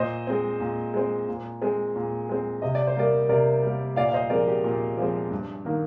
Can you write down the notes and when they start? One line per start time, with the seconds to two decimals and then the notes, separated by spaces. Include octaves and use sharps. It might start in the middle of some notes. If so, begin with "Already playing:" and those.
Already playing: A#2 C5 D#5
0.27 G#3 C4
0.60 A#2
0.94 G#3 C4
1.28 A#2
1.61 G#3 C4
1.96 A#2
2.29 G#3 C4
2.62 C3 D#5
2.75 D5
2.87 C5
2.96 G3 A#3 A#4 D5
3.29 C3 A#4 D5
3.63 G3 A#3
3.96 A#2 D5 F5
4.09 F5
4.14 C5 D#5
4.30 F3 G#3 C4 A#4 D5
4.47 G4
4.64 A#2
4.97 F3 G#3 C4
5.31 G2
5.65 D#3 A#3